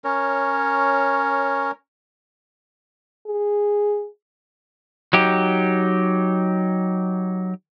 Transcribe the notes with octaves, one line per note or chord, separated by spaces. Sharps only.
C#4 A#4 C#5
G#4
F#3 D#4 G4